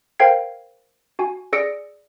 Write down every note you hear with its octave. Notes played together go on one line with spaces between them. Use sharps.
A#4 C5 F5 G5 G#6 C7
F#4 G#5
G#4 D5 E6 A#6 C#7 D7